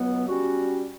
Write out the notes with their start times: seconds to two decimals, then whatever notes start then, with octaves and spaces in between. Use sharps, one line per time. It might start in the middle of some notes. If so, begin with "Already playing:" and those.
Already playing: C#2 B2 F#3 B3
0.28 G3 C#4 F#4